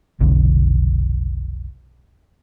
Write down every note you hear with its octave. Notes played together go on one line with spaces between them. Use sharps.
F1 B1 D3